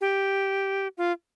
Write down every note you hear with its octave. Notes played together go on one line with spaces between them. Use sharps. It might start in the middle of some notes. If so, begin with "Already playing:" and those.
G4
F4